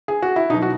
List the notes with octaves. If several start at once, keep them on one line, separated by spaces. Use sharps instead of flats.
G#4
F#4
E4
B2 F#3 D#4
F#4